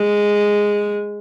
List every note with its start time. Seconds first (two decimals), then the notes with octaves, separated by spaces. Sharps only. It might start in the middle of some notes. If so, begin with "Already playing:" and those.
Already playing: G#3